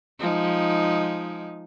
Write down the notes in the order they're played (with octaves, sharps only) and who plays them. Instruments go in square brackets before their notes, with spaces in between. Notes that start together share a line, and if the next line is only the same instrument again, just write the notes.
[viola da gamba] F3 G#3 D#4